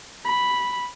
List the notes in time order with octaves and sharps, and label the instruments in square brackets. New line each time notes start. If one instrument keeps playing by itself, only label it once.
[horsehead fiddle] B5